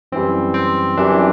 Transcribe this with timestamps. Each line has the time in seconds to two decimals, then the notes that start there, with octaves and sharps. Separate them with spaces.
0.12 F#2 E3 G3 C4
0.54 C4
0.97 F#2 E3 G3 D4